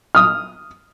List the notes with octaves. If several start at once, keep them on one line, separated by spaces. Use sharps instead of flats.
D#6 F6